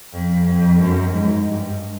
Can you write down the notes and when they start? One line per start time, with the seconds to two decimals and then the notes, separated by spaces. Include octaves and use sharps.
0.13 F2
0.46 F2
0.80 F#2
1.13 G#2
1.46 G2